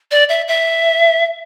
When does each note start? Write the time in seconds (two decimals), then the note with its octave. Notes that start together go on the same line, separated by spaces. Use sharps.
0.11 D5
0.29 E5
0.48 E5